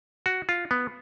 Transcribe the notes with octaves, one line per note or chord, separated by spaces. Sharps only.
F#4
F4
B3